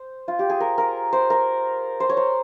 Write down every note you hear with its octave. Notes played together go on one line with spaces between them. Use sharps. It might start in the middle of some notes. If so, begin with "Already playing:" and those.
Already playing: C5
F4
G4
G#4
A#4
A#4
C5
A#4
C5
C#5
C5